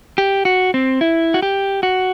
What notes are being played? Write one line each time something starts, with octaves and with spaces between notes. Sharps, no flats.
G4
F#4
C4
E4
F#4
G4
F#4